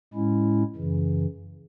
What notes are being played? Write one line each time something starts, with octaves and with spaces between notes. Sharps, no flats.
A2 G#3 C#4 E4
F#2 C#3 E3